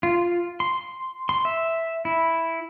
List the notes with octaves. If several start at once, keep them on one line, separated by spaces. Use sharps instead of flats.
F4
C6
C6
E5
E4